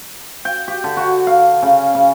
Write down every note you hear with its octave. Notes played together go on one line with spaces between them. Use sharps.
G5
G4
D3
F#4
F5
C#3
C#3